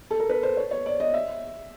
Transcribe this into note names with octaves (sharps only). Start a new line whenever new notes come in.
A4
A#4
B4
C5
C#5
C#5
D5
D#5
E5